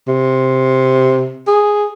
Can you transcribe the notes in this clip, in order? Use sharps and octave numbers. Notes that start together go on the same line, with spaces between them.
C3
G#4